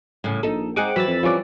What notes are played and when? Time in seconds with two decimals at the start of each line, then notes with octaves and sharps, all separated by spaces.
0.24 A2 C#3
0.43 A#1 D#4 A4
0.76 G#3 C4 D#4 G#4 F#5 D6
0.96 E3 F#3 B5 E6 A6
1.08 F2
1.23 E3 F3 G3 C#4 D5